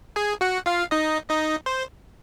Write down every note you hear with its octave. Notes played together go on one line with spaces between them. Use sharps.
G#4 G#5
F#4 F#5
F4 F5
D#4 D#5
D#4 D#5
C5